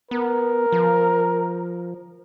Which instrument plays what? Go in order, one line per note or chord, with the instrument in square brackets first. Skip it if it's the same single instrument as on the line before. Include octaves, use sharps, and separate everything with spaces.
[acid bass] B3 [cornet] A#4
[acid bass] F3